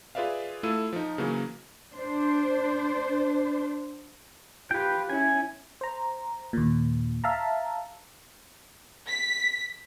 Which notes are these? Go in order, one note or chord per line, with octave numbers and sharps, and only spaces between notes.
F4 G#4 B4 D5 E5 F5
A3 E4 F4 A4 E6 D#7
F3 D#4
C#3 E3 F#3 A#3 C#4
D4 C5
F4 G4 B4 G5
C#4 E4 G#5
C5 A#5
D#2 A#2
E5 F5 A5 A#5
B6